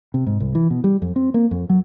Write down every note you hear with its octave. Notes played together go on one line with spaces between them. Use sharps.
C3
G#2
C2
E3
B2
G3
F2
C4
A#3
F2
F#3